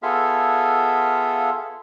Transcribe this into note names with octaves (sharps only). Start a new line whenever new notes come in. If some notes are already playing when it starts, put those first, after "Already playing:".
B3 F4 G#4 A4 E5 F5